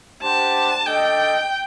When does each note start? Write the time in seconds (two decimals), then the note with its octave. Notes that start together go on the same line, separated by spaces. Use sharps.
0.22 D4 G4 C5 F#5 A5
0.86 D4 A4 D#5 G5